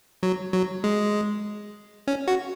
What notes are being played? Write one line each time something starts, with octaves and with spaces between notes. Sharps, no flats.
F#3
F#3
G#3
C#4
F#4